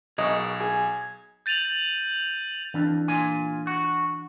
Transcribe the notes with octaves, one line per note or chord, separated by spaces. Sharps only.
B1 G#4 A#4 D#5 F#5 C#6
G#4 G#5
G6 A6 D#7 F7 F#7
F2 E3 D4
A#2 F4 G#5
F#4